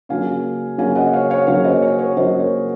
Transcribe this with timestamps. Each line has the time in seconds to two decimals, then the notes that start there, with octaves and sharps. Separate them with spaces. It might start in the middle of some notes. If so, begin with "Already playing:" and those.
0.09 C#3 F#3 A#3 F5 G#5
0.78 C#3 F#3 A#3 F5 G#5
0.95 D#5 F#5
1.13 C#5 F5
1.30 C#5 F5
1.47 C#3 F#3 A#3 C#5 F5
1.64 C5 D#5
1.82 A#4 C#5
1.99 A#4 C#5
2.17 C#3 F#3 A#3 C5 D#5
2.40 A#4 C#5